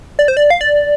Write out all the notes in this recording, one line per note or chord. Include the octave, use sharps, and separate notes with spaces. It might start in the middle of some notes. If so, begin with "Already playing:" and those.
D5
C5
D5
F5
D5